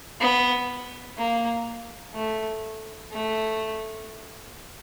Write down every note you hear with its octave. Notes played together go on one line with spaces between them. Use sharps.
B3
A#3
A3
A3